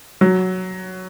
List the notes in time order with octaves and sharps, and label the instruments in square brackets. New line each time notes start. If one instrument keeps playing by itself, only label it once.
[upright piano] F#3